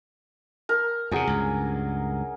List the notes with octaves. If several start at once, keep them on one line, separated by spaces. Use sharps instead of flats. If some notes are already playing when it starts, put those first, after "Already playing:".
A#4
E2 C3 F#3 G#4 G#5
C#2 G2